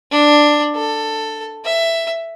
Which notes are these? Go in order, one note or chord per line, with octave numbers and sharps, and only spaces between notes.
D4
A4
E5